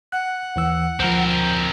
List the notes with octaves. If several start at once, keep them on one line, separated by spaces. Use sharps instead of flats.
F#5 F#6
D#2 E3 E6
D2 F3 C4 A#4